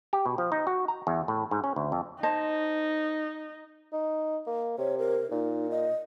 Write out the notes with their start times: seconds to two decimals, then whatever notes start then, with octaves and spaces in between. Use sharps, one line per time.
0.13 G4
0.26 B2
0.38 F3
0.52 D#4
0.67 F#4
0.88 A#5
1.07 E2
1.28 A2
1.51 G#2
1.64 C#4
1.76 D2
1.92 F2
2.23 D#4 C5 D#5 A5
3.93 D#4
4.47 A#3
4.78 C3 C#5
4.99 A#4
5.31 A#2 D#4
5.71 D#5